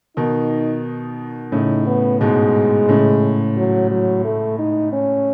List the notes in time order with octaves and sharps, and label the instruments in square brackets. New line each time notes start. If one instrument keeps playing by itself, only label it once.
[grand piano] B2 D#3 [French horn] D#4
[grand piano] A2 C#3 [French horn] D#4
[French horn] B3
[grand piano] G#2 B2 [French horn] G#3
[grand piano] A2 C#3
[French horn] F#3
F#3
A3
D#4
C#4